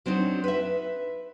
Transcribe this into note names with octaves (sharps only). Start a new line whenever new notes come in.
F#3 C4 D4 D#4
B4 E5